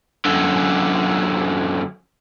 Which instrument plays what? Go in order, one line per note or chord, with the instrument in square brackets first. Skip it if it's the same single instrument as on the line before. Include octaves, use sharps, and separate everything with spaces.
[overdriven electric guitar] F#2 D3